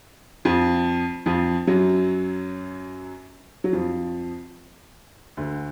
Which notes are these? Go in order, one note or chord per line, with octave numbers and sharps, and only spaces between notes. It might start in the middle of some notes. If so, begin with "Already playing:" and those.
F2 F3
F2 F3
F#2 F#3
F#3
F2 F3
D2 D3